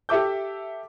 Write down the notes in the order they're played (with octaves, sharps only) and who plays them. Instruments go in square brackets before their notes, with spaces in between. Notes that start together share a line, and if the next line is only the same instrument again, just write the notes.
[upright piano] G4 A4 E5 D6 G6